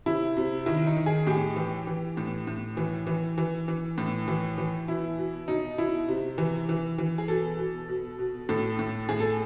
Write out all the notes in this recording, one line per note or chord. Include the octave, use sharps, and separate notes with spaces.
C3 E4
C3
D#3 E4
D#4
D#3
G#4
A2 G4
E3
E3
A2
A2
E3
E3
E3
E3
A2
E3
E3
B2 E4
B2
B2 D#4
B2 E4
C3
E3
E3
E3
G#4
B2 A4
B2
B2
B2
A2 A4
A2
A2 G#4
A4